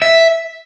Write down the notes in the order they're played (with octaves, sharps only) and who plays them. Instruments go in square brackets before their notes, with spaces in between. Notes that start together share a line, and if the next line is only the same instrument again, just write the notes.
[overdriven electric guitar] E5